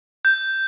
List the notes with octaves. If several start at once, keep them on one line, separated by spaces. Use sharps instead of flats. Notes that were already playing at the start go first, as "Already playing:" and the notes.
G6